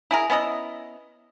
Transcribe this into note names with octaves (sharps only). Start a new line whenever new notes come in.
E4 G#4 A#4
B3 C#4 E4 D#5